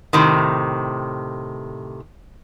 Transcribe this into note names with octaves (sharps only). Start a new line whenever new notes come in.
A2 C3 D#3